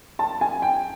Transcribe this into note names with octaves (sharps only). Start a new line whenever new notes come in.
A5
G#5
G5